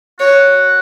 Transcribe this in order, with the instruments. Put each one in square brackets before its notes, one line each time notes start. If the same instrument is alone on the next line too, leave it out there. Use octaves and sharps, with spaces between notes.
[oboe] F#4 [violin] C#5